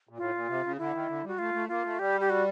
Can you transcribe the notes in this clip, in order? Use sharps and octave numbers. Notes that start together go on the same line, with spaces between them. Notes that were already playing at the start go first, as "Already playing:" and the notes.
A#2
A2 F4
A#2
C3
C#3
D3 E4
D#3
D3
G3 F#4
A3 F4
A3
A#3 F4
A3
G3 G4
G4
F#4